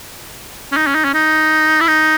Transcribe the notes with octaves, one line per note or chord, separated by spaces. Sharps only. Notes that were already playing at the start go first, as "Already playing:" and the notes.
C#4
D#4
C#4
D#4
C#4
D#4
E4
D#4